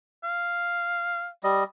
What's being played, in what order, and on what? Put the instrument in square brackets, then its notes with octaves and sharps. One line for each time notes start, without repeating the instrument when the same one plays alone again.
[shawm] F5
[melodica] G3 D#5